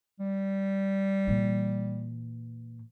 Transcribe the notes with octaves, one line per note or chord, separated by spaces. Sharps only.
G3
A#2 E3